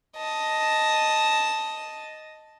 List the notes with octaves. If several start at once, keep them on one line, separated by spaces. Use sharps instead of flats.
D#5 A5